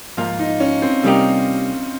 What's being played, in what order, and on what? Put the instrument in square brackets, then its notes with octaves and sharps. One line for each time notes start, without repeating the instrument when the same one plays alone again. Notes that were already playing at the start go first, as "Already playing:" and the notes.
[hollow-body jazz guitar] G#2 F3 A#3 [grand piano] F4
[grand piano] D#4
C#4
C4
[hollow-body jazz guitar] C3 G3 A#3 D#4 G4